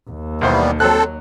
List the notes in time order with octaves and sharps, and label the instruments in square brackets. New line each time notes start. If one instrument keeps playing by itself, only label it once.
[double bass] D#2
[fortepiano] B1 C5 [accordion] E3 G3 B3
[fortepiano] F#3 F#6 [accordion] C4 A4